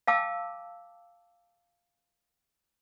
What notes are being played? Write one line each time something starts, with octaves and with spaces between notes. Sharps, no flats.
F5 G5 A5 D6 E6